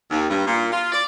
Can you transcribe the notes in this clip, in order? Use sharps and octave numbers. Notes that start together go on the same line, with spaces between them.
D#2
G2
A#2
F4
D5